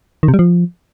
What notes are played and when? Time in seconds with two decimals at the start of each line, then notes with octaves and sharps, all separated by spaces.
0.23 D#3
0.28 C3
0.34 G3
0.39 F3